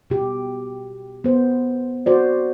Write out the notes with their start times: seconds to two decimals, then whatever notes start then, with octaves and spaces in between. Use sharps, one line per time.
0.10 B2 G4
1.24 B3 C5
2.06 F#4 C5 D5